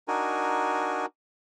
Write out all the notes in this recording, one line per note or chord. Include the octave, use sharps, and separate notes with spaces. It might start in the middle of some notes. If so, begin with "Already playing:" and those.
D4 D#4 F#4 A#4 G#5